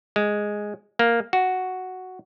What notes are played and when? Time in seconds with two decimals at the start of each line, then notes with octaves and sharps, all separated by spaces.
0.16 G#3
0.99 A#3
1.33 F#4